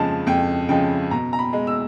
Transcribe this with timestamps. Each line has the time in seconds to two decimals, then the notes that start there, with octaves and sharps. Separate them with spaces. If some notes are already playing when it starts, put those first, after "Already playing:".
Already playing: F2 C#3 F3 G#3 A5
0.27 F2 G5
0.69 C#3 F3 G#3 G5
1.11 B2 A#5
1.33 A#5
1.39 B5
1.53 G#3
1.67 E6